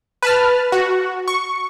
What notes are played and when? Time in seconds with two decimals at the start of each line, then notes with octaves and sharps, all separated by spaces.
0.23 B4 A5 F6
0.72 F#4
1.28 C#6